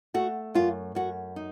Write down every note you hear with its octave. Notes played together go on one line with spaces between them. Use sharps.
A3 F#4
F#2 F4
F#2 F#4
D#4